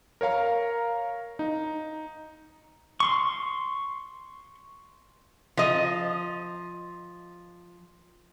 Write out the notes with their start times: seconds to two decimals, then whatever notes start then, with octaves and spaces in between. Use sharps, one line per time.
0.21 A#4 C#5 F5 A#5
1.39 D#4
3.00 C6 C#6
5.57 F3 D#5